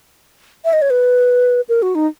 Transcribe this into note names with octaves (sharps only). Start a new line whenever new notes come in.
E5
D#5
C#5
B4
A#4
F#4
D#4